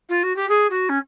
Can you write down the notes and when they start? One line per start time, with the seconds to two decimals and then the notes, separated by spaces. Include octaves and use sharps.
0.09 F4
0.23 F#4
0.36 G4
0.49 G#4
0.70 F#4
0.89 C#4